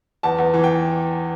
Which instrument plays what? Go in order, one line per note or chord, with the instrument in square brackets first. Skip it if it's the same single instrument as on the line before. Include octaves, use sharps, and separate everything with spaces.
[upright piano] E2 A5
E2
E3
G5